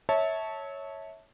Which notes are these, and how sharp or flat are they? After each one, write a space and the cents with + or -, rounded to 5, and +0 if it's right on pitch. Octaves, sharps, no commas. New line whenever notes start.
C#5 +0 E5 -25 A5 +0